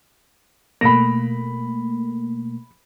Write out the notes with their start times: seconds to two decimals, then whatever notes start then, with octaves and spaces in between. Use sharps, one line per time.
0.81 B2 A3 A#3 B5 A#6